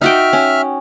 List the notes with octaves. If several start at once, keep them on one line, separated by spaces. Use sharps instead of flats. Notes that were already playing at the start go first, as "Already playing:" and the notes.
D#4 F#4 E5 G5 F6
C#4